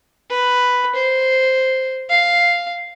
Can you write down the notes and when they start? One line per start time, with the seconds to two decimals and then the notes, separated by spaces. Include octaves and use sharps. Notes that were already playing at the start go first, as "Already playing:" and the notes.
0.30 B4
0.95 C5
2.10 F5